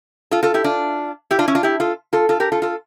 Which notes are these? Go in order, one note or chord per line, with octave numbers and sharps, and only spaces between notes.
F4 A4
F4 A4
E4 G4
D4 F4
E4 G4
D4 F4
C#4 E4
D4 F4
E4 G4
F4 A4
F4 A4
F4 A4
G4 A#4
F4 A4
F4 A4